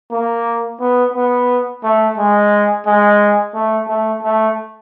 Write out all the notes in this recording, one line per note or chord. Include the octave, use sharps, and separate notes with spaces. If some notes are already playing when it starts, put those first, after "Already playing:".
A#3
B3
B3
A3
G#3
G#3
A3
A3
A3